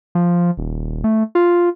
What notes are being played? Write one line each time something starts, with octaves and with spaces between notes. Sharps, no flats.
F3
D#1
A3
F4